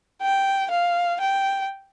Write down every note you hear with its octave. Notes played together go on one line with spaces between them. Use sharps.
G5
F5
G5